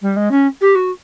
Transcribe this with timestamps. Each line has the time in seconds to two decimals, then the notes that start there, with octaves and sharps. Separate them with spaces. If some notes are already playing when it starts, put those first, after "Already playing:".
0.01 G3
0.16 G#3
0.31 C#4
0.61 G4
0.75 F#4